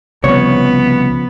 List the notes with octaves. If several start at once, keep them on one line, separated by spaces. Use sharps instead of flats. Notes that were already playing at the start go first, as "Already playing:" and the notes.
C2 C#3 F3 B3 C#5